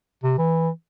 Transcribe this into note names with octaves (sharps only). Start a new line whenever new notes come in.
C3
E3